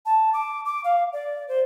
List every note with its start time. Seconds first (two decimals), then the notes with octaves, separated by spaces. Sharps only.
0.06 A5
0.33 D6
0.65 D6
0.84 F5
1.13 D5
1.48 C5